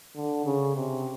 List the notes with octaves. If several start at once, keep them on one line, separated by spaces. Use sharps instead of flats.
D3
C#3
C3